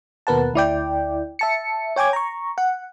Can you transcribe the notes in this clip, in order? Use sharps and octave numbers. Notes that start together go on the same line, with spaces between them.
D#2 B2 A#4 B4 F#5 A5
D2 E4 D5 G5
E5 A5 C#7
C#5 G5 G#5 D6 G#6
A#5 C#6
F#5